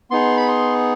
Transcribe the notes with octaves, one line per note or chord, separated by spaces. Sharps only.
B3 D#4 G#4 C6
B5
C6